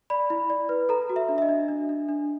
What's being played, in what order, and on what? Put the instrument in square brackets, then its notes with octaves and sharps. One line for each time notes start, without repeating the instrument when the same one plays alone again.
[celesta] D5 B5
E4
D5
B4
A4 A#5
F#4
E5
D4
E5
D#5
D4
D4
D4
D4